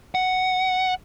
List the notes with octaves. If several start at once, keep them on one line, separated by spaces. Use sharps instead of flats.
F#5